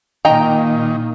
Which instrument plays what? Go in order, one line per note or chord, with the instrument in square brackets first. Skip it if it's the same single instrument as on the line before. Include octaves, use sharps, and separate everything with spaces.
[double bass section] A#2 A#3 [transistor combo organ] D#3 [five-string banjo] D#5 G5 A#5